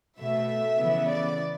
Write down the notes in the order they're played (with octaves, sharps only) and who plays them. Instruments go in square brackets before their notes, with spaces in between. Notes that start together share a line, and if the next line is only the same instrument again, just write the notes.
[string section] B2 A3 E5
C#3 E3 B3
D5